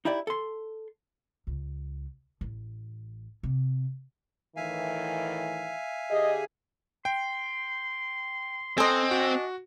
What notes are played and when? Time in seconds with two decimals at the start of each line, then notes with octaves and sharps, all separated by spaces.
0.05 D#4 E4 G4 D5
0.27 A4 C6
1.47 C#2
2.41 A1
3.43 C3
4.56 A2 D#3 E3 E5 F5 G#5
6.10 D3 G4 G#4 D#5
7.05 G5 C6
8.78 C4 F#4 A4 D#5 G#5 C6
9.11 D4 F#4